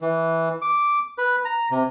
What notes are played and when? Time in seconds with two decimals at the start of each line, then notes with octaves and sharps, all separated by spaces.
0.01 E3
0.62 D6
1.18 B4
1.45 A#5
1.71 C3